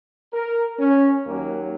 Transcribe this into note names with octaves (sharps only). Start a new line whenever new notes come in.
A#4
C#4
D#2 D#3 F#3 A#3